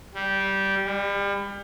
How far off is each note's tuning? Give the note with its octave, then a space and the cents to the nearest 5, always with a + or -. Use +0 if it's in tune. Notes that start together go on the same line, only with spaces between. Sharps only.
G3 -10
G3 +35